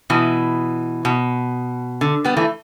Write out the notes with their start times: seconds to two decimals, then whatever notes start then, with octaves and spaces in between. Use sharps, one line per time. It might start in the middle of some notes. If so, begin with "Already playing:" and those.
0.10 B2 E3
1.05 B2
2.01 D3
2.24 G3 B3
2.37 E3 A3